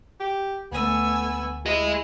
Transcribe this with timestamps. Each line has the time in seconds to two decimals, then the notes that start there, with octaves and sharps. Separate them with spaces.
0.20 G4
0.72 D2 A3 B3 G#5 E6
1.66 E4 G#4 D#5